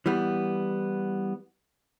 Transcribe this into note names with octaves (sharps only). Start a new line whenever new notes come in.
E3 G3 B3